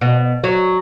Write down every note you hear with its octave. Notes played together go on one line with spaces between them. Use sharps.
B2
F#3